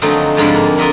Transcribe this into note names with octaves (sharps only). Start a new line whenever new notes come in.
D3 F3 F#3 A3 C4 D#4
F2 G#2 D3 F3 G3
A#3
F4 A#4 D#5 E5 F#5